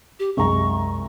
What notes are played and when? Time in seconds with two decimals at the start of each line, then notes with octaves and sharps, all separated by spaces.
0.20 G4
0.37 C2 F#2 G#3 A#5 C#6